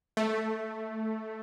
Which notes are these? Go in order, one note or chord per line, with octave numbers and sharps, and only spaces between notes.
A3